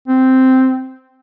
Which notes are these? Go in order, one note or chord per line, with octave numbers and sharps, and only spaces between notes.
C4